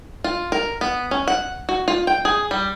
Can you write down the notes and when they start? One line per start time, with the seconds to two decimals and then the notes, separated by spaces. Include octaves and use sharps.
0.24 F4
0.52 A#4
0.81 B3
1.11 C#4
1.28 F#5
1.69 F#4
1.88 F4
2.07 G5
2.25 G#4
2.51 G3